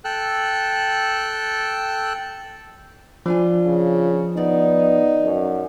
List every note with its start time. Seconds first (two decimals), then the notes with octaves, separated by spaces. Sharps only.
0.05 A4 G5 E6 F#6
3.26 F3 D4 F4 G#5
3.67 C#3
4.37 D#3 B3 D#4 D5
5.24 F#2